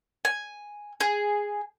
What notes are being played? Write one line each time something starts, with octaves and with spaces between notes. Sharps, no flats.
G#5
G#4